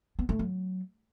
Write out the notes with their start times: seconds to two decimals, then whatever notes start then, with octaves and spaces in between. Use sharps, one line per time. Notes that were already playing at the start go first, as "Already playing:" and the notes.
0.19 B3
0.29 A3
0.39 F#3